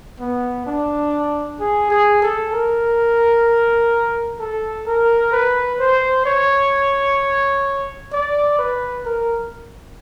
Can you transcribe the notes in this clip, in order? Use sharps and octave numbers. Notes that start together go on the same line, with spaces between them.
B3
D4
G#4
G#4
A4
A#4
A4
A#4
B4
C5
C#5
D5
B4
A#4